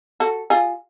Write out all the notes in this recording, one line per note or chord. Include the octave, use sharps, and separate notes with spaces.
F#4 A4
F4 G#4